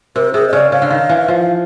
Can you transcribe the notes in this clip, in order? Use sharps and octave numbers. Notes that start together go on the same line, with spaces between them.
C3 A#4
C3 G#4
D#5
C#3 D5
C#3 F5
D3
D#3
E3
F3